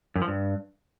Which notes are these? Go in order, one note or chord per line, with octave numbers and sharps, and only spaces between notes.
F#2
F3
G2